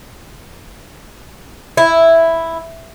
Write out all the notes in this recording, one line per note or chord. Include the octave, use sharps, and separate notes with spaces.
E4